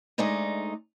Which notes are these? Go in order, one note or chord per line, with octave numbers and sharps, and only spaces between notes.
D2 G#3 A3 D#4 D5 D#5